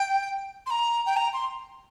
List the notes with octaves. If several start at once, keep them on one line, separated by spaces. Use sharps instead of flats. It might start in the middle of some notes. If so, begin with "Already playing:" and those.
Already playing: G5
C6
A#5
G5
A#5
C6